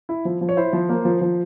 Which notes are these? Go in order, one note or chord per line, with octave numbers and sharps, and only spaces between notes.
E4
F3
F3
C#5
E4 C5
F3
A#3
F3
F3